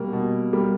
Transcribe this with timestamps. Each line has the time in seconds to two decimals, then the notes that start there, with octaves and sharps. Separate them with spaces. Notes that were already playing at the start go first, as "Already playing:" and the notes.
Already playing: B2 G3 A#3
0.13 B2
0.53 G3 A#3